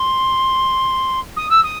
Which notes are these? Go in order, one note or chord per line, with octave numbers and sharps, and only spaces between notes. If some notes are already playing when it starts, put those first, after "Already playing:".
Already playing: C6
D#6
E6
D#6